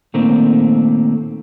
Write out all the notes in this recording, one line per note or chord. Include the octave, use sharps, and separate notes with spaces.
A#2 D#3 A3 A#3 C4